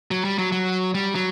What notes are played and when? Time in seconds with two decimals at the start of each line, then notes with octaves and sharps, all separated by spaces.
0.11 F#3
0.24 G3
0.39 F#3
0.52 F#3
0.94 G3
1.15 F#3